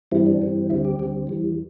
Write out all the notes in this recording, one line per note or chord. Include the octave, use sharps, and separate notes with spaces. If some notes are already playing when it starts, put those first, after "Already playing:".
G2 E3 G3 C4 E4
D4
G2 E3 G3 C4
D2 D3 G3 C4 E4
G4
D2 D3 G3 C4
E2 E3 G3